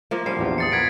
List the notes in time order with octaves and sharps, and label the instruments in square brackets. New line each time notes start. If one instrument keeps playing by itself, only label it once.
[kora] F3 A#3
[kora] F3 [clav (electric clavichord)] G3 C#4 [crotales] C7
[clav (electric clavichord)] A#1 E2 G4
[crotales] D#6 A6 C#7
[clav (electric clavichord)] A#3 B3 [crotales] G#6 B6 D7